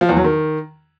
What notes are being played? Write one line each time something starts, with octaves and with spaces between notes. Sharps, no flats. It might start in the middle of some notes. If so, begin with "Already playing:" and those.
F3
E2
F#3
D#3